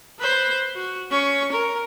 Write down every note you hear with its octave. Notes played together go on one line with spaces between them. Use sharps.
B4 C5
F#4
C#4 C#6
A#4